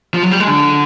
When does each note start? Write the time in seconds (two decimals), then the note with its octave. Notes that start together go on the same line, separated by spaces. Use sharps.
0.14 F3
0.23 F#3
0.31 G3
0.40 G#3
0.47 D3